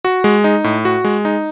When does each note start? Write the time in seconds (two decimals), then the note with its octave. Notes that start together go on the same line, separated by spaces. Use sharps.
0.05 F#4
0.24 G#3
0.44 D#4
0.64 A2
0.85 F#4
1.04 G#3
1.25 D#4